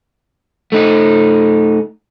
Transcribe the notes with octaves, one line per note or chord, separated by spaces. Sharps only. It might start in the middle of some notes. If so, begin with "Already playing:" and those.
A3 D#4